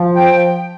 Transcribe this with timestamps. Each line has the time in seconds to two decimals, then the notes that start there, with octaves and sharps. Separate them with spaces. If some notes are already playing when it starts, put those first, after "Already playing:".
Already playing: F3
0.16 G5